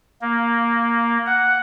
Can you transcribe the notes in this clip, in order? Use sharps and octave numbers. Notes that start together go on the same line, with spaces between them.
A#3
F#5